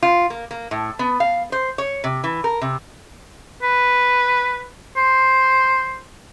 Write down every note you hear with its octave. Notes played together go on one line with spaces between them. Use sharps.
F4
A#3
A#3
A2
B3
F5
C5
C#5
C3
E3
A#4
C3
B4
C5